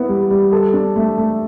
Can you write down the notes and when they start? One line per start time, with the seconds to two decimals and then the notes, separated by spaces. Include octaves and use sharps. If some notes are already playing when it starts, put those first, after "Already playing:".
Already playing: B3 E4
0.09 G3
0.30 G3
0.52 A4
0.74 D4
0.96 A3
1.18 A3